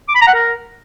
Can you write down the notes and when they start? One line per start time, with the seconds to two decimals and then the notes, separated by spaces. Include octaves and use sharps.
0.08 D6
0.15 B5
0.21 A#5
0.28 F#5
0.34 A#4